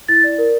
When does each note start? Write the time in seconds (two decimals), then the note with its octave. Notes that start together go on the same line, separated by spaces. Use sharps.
0.08 E4 A6
0.24 D5
0.38 A#4